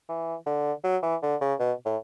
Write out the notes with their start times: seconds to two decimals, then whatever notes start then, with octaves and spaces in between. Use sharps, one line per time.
0.09 E3
0.46 D3
0.84 F#3
1.03 E3
1.23 D3
1.41 C#3
1.60 B2
1.86 A2